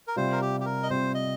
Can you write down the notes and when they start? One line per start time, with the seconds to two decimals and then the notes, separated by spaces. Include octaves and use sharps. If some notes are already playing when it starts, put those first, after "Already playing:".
0.08 A#4
0.16 C3 G3 C4 F4 C5
0.32 A#4
0.41 G4
0.60 G4
0.65 A#4
0.83 D#5
0.90 C3 G3 C4 F4 C5
1.14 D#5